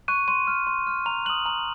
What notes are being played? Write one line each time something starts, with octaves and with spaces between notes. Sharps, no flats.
C#6 F#6 D#7
C6 D#7
F6
C6
F6
A#5 F7
D#6 F#6 F#7
A#5 F#7